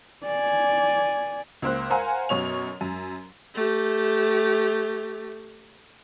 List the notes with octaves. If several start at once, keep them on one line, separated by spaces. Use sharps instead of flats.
D5 G#5
C#2 A#3 C5 F#6
A#4 C5 F5 F#5 G#5 A#5
F#2 B2 C#5 F7
F#2
A3 G4